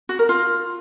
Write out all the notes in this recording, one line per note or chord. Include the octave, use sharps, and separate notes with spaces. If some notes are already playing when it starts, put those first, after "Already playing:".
F#4
A#4
F4